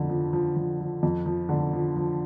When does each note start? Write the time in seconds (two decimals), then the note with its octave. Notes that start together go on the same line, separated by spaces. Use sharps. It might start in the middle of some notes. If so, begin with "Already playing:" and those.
Already playing: F2 D3
0.10 F3
0.33 F3
0.56 F3
0.80 F3
1.03 F2
1.26 F3
1.49 D3
1.73 F3
1.96 F3